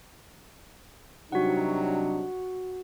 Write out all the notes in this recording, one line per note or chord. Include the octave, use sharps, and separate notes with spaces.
C3 F#3 G3 D4 D#4 F#4 F#5